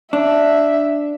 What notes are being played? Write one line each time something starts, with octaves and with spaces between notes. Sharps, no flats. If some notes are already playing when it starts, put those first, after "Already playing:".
D4 E5